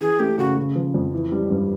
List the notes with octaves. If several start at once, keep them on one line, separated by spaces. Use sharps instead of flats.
E3 G#4
A3 G4
C#3 F#4
C#3
F3
F2
E3
G3
G2